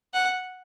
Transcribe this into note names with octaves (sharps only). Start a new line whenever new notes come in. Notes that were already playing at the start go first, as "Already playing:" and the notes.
F#5